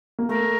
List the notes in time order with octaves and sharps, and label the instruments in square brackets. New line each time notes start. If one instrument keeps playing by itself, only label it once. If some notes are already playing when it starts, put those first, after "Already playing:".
[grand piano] A#3
[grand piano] A3 [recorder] A#4